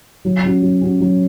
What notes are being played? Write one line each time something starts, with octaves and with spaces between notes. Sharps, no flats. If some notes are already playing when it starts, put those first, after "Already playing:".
F#3
C#4 F#4
F#3
C#4 F#4
F#3